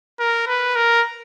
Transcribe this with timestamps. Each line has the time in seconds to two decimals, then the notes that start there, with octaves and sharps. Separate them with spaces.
0.19 A#4
0.47 B4
0.76 A#4